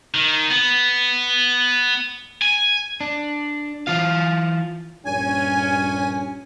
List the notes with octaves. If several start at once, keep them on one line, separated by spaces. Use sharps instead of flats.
D#3
B3
G#5
D4
E3 F4 F5
A#1 G2 C#4 G#5